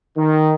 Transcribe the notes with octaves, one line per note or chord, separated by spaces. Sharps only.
D#3